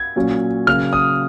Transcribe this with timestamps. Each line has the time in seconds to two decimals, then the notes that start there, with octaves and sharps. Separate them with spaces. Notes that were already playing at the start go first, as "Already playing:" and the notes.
Already playing: G#6
0.16 A#2 F#3 C#4
0.67 C#3 F#3 A#3 F6
0.93 D#6